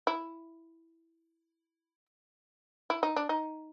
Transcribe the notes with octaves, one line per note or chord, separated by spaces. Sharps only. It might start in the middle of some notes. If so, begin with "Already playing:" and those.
E4
E4
D#4
D4
D#4